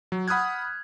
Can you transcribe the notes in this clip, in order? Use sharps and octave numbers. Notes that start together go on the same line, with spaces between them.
F#3
F#5 B5 D#6 F6 F#6 G#6